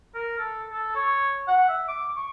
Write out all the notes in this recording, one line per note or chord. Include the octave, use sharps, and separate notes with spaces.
A#4
A4
A4
C#5
F#5
E5
D6
C#6